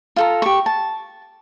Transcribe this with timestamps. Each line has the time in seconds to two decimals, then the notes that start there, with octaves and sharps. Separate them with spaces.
0.16 F4 A4 A#5
0.42 G4 C#6
0.66 A5